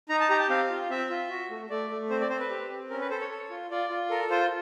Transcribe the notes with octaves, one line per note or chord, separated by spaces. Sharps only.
D#4 A#5
A5
G4 A#5
A5
C4 F5
F4
C4 E5
F4
F#4
A3
A3 D5
A3
C4 C5
D5
C4 C5
B4
G4
C4
C#4 A#4
B4
A4 C5
C#5
A4
F4
F4 D5
F4
A4 A#4
F4 C5